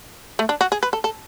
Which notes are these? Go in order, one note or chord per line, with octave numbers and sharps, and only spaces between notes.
A3
D4
F#4
G#4
B4
A4
A4